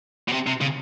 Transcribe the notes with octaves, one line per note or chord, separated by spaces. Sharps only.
B2
C3
C3
C#3